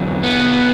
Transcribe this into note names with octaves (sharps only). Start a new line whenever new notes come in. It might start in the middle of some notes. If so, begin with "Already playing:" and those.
Already playing: E2 D3 F#3
B3